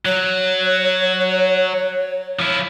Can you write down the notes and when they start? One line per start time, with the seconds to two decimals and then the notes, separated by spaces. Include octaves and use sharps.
0.05 F#3 C#5
2.39 F3 E4